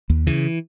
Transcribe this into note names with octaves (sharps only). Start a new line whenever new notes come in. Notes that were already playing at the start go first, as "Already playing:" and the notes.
D#2
C#3 E3